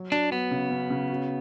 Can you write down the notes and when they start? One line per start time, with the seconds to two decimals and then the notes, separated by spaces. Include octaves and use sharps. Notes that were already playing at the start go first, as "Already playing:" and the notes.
Already playing: F#3
0.12 D4 F#4
0.32 F#3 B3
0.51 C#3
0.71 C#4
0.90 C#3
1.10 F#4